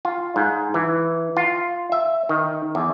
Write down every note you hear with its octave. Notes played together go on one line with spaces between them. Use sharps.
F4
G#2
E3
F4
E5
D#3
E2